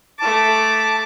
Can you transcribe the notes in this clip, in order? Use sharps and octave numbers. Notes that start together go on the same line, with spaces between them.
A3 A5 D6